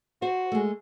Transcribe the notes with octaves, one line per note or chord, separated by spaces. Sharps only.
F#4 C5
G#3 A3